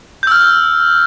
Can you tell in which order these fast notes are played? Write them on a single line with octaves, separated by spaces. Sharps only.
G6 E6 F6